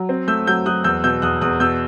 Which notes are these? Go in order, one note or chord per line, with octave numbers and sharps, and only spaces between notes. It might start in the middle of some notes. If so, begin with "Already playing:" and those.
Already playing: F#3
C4
A3 E6 G6
F#3 E6 G6
F#3 D#6 F#6
E2 E6 G6
B2 E6 G6
E2 D#6 F#6
E2 D#6 F#6
B2 E6 G6